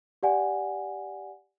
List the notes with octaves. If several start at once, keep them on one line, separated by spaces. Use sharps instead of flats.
G4 D5 F#5 G#5